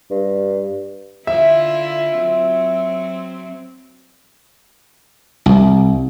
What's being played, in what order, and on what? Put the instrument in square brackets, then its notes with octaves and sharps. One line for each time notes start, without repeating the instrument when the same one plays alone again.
[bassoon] G2
[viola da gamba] D3 E4 F4 [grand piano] E5
[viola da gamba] F#3 C4
[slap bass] C2